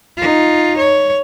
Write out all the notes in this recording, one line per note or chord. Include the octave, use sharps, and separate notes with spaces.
D#4 F4
C#5